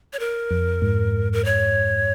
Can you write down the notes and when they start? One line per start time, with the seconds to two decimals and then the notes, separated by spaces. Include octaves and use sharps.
0.13 C#5
0.19 A#4
0.51 F2
0.82 G#2
1.33 A#4
1.45 C#5